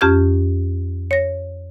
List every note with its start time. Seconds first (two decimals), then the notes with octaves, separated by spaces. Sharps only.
0.01 F2 C#4 G4 F6 G#6
1.11 C#5 A#6